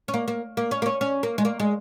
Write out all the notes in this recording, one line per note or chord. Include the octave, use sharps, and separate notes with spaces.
C#4
A#3
A#3
A#3
C#4
A#3
C#4
C#4
A#3
G#3
A#3
G#3